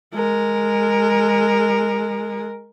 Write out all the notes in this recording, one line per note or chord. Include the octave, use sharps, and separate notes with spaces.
G#3 A#4